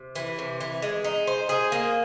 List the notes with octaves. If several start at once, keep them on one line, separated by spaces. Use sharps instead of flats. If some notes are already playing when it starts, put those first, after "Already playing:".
Already playing: C3
E3
C3
E3
G#3
D#4
C5
G#4
A#3